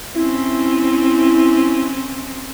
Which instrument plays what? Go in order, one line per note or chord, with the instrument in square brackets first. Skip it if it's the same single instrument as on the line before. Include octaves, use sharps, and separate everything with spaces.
[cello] C4 C#4 [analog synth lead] E4